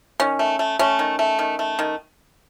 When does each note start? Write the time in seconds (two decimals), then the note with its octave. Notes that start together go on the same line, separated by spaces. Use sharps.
0.20 D#3 C#4
0.39 A3
0.59 A3
0.79 A3 C#4
0.99 D#3
1.19 A3
1.39 D#3
1.59 A3
1.79 D#3